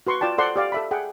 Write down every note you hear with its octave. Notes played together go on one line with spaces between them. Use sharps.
F#4 B4 C6 C#6
F4 D5 G5 A5
A4 C5 D5 F#5 C6
G4 D5 F5
A4 E5 B5
G#4 F#5 G5